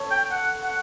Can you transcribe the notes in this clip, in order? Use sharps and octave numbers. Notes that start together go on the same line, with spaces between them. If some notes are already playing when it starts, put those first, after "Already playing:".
Already playing: A4 C#5
G5
F#5
F#5